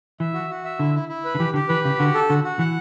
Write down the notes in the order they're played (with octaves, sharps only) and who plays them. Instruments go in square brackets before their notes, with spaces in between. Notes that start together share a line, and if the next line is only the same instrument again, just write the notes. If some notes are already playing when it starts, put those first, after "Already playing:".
[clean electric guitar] E3 [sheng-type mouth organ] E5
[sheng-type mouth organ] F#4
F#4
E5
[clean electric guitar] D3 [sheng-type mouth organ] E4
[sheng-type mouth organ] E4
E4
B4
[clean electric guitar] D3
[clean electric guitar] E3 [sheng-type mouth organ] G4
[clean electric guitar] D3 [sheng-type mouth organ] G4
[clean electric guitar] E3 [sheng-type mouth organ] B4
[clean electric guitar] C#3 [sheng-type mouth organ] G4
[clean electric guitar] D3 [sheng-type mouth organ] F#4
[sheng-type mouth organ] A4
[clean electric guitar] D3 [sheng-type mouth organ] F#4
[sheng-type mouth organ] F#4
[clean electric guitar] E3 [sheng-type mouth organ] F#5